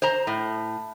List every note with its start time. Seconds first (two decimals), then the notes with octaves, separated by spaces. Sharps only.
0.02 C5 A#5
0.27 A2